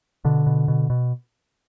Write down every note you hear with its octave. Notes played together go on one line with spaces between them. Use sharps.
B2 D3
B2
B2
B2